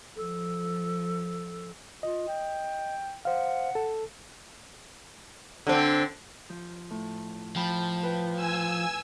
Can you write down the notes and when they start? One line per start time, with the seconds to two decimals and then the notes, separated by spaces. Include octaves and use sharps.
0.16 F3 A4
2.03 F4 D#5
2.28 G5
3.25 C5 F5 F#5
3.75 A4
5.67 D3 C4
6.49 F3
6.90 A2
7.56 F3 G5 A5 B5
8.03 B4 G5
8.36 G#5 E6